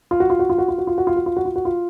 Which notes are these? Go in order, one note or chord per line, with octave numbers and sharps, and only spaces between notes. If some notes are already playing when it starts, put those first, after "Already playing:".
F4
F#4
F4
F#4
F4
F#4
F4
F#4
F4
F#4
F4
F#4
F4
F#4
F4
F#4
F4